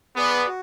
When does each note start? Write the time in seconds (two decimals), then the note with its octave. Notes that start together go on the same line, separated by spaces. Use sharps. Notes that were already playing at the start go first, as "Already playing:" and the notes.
0.16 B3 G#4 B4 D5
0.47 F#4